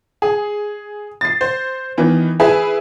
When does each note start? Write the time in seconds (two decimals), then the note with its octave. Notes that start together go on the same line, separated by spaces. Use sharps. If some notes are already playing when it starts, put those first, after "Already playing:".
0.22 G#4
1.21 A6 C7
1.41 C5
1.98 D#3 E3 B3
2.40 E4 G#4 B4 E5